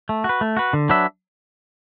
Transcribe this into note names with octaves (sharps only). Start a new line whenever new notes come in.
A3
F#4
B4
A3
F#4 B4
D3
F#3 D4 B4 E5